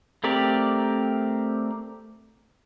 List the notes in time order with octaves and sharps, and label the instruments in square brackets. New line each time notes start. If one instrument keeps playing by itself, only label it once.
[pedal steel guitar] A3 C4 G4 A#4 D5